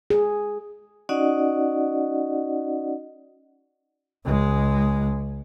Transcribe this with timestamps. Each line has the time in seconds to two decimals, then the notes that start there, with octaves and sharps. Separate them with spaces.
0.10 G#4
1.09 C#4 D#4 F#4 D5 D#5 F#5
4.25 C#2 G#3